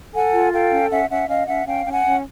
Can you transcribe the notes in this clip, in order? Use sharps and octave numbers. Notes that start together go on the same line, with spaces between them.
A4 F#5 G#5
F4
A4 F5 G5
C#4
C#4 E5 F#5
C#4 E5 F#5
C#4 D#5 F5
C#4 E5 F#5
C#4 F5 G5
C#4 G5
F#5 G#5
C#4